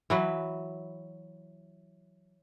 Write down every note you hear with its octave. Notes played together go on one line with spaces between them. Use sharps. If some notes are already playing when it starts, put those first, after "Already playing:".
E3 F#3 B4